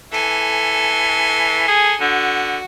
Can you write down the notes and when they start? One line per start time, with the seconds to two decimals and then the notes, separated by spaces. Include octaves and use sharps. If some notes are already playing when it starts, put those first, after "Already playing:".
0.12 E3 A4 G#5
1.68 G#4
2.00 D3 F#4